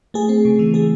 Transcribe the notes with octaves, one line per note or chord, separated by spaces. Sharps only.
A3 G#4
C4
C#3
E3
A3 G#4